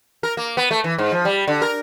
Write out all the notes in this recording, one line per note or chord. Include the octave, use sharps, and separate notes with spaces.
A#4
A#3
B3
A3
E3
G#2
F3
G3
D3
A#4